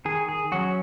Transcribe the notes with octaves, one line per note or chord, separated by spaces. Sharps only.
D#3 G#4
G#4
F#3 C#4 F#4